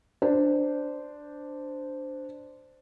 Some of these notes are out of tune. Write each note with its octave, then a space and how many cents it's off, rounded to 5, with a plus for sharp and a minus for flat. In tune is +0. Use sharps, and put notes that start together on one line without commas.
D4 +0 C5 -10